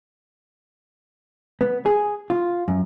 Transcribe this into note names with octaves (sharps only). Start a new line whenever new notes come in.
B3
G#4
F4
F#2